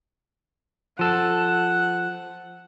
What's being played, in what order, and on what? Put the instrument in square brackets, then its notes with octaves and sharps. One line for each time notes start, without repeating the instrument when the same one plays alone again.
[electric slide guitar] F3 A4 [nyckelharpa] F#5